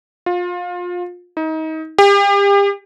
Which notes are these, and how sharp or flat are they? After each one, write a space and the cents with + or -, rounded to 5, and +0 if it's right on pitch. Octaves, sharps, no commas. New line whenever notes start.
F4 +25
D#4 +30
G4 +35